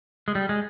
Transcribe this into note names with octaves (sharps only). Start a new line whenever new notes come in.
G#3
G3
G#3